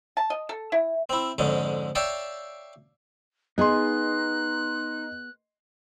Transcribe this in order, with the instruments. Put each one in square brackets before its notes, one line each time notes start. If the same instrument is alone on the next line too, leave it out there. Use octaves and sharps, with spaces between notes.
[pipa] A5
D#5
A4
E4
[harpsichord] C4 E4
F2 G#2 D3 C#4
C#5 D5 E5 F5 G5 A5
[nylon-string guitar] B3 G#4 [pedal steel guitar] D#4 [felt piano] D#5 C6 [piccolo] F#6